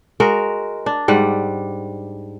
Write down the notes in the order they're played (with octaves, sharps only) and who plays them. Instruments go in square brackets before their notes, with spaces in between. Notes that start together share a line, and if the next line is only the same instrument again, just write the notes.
[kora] G#3 F#4 A#4
D4
G#2 G3 F#5